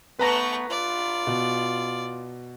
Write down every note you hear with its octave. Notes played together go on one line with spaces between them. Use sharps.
A3 B3 B4 A#5 C#6 A#6
F4 D5
B2